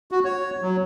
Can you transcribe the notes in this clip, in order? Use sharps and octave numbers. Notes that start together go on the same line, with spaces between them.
F#4
C#5
F#3